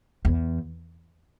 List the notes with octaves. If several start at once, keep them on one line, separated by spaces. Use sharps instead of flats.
E2